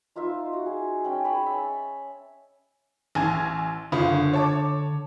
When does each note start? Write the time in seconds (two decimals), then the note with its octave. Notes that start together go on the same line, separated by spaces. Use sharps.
0.16 D#4 F4 C5 E5
0.53 F#4
0.66 G#4
1.04 C#4 G5
1.24 G#4 C#5 B5
1.46 E5 A5
3.15 A1 G#5 G#6
3.92 F#1 D3 F4 B5 D#6
4.33 C#5 A5 D6